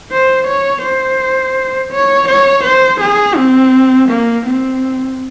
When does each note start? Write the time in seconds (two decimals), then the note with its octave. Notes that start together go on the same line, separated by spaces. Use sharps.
0.11 C5
0.48 C#5
0.83 C5
1.92 C#5
2.29 C#5
2.64 C5
3.01 G#4
3.36 C4
4.09 A#3
4.46 C4